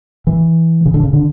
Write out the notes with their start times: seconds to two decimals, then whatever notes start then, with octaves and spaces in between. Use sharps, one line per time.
0.27 E3
0.86 C#3
0.94 D3
1.03 C#3
1.13 D3